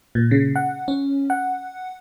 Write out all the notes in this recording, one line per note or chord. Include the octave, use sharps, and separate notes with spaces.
A#2
C#3
F#5
C#4
F#5